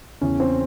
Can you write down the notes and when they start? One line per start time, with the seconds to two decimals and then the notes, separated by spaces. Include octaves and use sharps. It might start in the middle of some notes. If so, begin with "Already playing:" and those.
0.21 E2 C#3 E3 C#4
0.40 C4